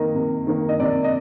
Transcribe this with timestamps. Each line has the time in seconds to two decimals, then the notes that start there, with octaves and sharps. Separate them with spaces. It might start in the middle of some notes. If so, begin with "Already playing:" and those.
Already playing: C3 D#3 A#3 D#5
0.15 C3
0.47 D#3 A#3
0.69 D#5
0.80 C3 D5
1.04 D#5